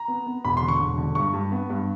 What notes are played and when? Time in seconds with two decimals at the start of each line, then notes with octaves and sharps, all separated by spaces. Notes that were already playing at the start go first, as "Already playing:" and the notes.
Already playing: A#5
0.08 B3
0.27 B3
0.44 E1 B5
0.57 C6
0.62 D3
0.68 C#6
0.80 E1
0.98 D3
1.15 G2 C#6
1.33 G2
1.52 B3
1.70 G2